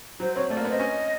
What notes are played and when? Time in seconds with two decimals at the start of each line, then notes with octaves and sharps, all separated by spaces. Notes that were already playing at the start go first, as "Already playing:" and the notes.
0.20 F#3 C5
0.35 C4 C#5
0.50 A3 D5
0.57 A#3
0.60 D5
0.65 B3
0.70 C4 D#5
0.79 C#4